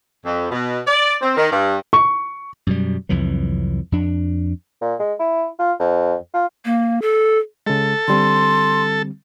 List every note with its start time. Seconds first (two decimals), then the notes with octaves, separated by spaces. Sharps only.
0.25 F2
0.50 B2
0.86 D5
1.22 C4
1.37 D#3
1.52 G2
1.93 C#6
2.67 F#2 B2 G3
3.09 C2 F2 E3 F#3
3.92 F2 D4
4.81 A#2
4.99 G#3
5.19 E4
5.59 F4
5.79 F2
6.34 F4
6.65 A#3
7.02 A4
7.67 C#3 G#3 A4
8.08 D3 G3 C4 C6